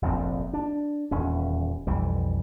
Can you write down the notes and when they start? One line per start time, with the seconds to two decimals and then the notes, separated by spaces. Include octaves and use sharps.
0.02 F1 A#1 F2 C4
0.53 D4
1.11 D#1 E2 C#4
1.87 B1 F2 E3 G3